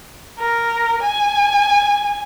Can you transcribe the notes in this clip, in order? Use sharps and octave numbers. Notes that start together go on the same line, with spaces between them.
A#4
G#5